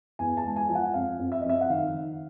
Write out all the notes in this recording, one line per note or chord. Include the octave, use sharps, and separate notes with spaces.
E2 G#5
A5
G#3
G#5
F3
F#5
F2 F5
F2
E5
F2 D#5
E5
F#5
D#3 F5
D#3